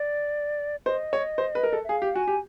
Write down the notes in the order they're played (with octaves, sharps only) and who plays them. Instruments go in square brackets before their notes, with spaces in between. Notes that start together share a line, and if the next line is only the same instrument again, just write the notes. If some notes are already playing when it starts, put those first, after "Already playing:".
Already playing: [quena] D5
[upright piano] C5 [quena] D#5
[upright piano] C#5
C5
B4
A#4
A4
[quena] E5
[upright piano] G#4 [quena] F5
[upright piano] G4
[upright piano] F#4 [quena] G#5
[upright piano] G4